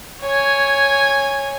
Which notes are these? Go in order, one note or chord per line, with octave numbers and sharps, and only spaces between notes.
C#5 G#5